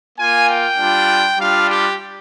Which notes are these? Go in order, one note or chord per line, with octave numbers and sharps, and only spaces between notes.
A#3 F4 G#5
G5
G3 D4 F4
G3 D4 F4 F5
G4